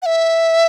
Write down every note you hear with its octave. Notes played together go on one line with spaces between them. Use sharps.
F#5
E5